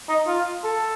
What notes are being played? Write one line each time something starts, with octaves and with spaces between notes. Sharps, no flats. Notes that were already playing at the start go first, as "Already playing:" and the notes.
D#4
F4
A4